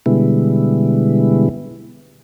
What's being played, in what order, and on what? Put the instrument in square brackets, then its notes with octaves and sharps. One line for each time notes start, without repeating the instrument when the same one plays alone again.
[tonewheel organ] B2 D3 G3 G#3 B3 E4